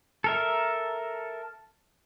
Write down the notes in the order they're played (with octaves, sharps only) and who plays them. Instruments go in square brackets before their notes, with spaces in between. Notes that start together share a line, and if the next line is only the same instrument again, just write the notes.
[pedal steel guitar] A4 A#4 E5